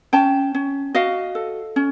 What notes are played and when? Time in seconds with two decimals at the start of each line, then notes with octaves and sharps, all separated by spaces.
0.13 C#4 G5 A5
0.54 C#4
0.95 F#4 D#5 F5
1.35 A4
1.76 C#4